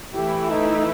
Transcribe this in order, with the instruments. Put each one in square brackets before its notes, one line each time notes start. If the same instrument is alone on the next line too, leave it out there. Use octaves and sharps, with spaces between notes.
[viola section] E3 A3 E4 [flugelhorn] G4
[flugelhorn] D#4